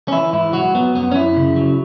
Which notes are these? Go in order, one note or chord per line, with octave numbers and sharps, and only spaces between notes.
C#4
E3 E4
G#2 E4
F#3 F#4
F#3 B3
F#2 B3
C#4
F#2 E4
C#3
F#3